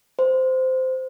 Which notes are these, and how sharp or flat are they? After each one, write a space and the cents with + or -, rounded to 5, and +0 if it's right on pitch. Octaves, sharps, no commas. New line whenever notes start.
C5 -15